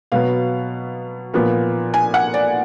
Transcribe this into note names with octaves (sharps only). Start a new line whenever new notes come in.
B2 F#3 B3 F5
A#2 F3 B3
G#5
F#5
D5